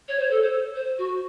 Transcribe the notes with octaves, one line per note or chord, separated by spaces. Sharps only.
C#5
C5
A4
C5
C5
F#4